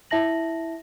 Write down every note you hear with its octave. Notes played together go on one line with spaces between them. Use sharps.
E4 E5 A5 A#6 F#7